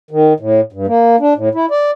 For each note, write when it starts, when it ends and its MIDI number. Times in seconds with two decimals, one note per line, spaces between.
0.11 0.33 51
0.40 0.61 45
0.73 0.86 43
0.87 1.16 58
1.20 1.34 62
1.37 1.49 45
1.55 1.66 64
1.71 1.91 74